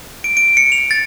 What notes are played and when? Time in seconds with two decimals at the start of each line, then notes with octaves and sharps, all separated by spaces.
0.24 D7
0.37 D7
0.57 C#7
0.72 F7
0.91 A6